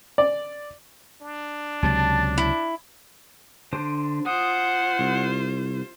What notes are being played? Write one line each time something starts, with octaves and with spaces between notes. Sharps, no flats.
D5
D4
C#2 C3 F#3 A5
E4
D3 D4 C5
F4 C5 F#5 D#6
C2